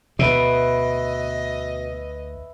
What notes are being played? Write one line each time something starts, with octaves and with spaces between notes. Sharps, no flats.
D2 B2 B4 D#5 E5